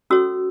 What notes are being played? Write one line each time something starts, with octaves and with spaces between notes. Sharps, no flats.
C#4 F#4 A4 C#5 E6